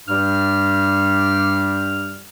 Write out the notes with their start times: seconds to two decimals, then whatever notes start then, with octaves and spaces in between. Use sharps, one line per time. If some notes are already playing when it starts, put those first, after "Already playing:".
0.08 G2 G3 G4 F6